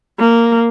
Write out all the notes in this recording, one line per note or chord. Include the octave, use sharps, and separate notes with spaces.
A#3